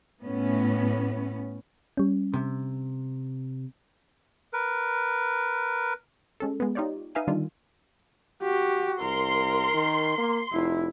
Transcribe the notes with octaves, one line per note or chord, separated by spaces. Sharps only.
A2 B3 C#4
G3 C#4
C3
A#4 B4
G#3 C#4 A4
G#3 B3
D#4 F4 G4 C#5 D5
D#4 B4 E5 F5 G#5 D#7
D3 D#3 G3 D4 F4
F#4 G4
C2 A#4 C6
D#3
A#3
F1 E4